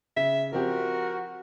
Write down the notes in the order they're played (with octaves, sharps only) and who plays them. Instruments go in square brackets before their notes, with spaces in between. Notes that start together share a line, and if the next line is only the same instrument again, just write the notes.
[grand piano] C#3 [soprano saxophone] E5
[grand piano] F3 C4 G4 [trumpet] F#4 [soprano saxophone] A#4